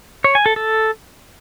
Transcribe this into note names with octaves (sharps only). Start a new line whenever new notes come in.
C#5
G#5
A4
A4